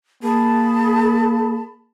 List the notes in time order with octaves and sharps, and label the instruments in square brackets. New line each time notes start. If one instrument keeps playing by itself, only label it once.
[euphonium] A#3 [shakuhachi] G#4 [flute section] A5 B5